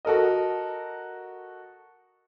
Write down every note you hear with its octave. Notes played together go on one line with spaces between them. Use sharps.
F#4 A4 A#4 D#5